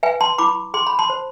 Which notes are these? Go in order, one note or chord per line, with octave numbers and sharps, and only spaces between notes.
B4 E5 G#5
A5 C6
E4 B5 D6
G#4 C6
B5
A5 C6
C5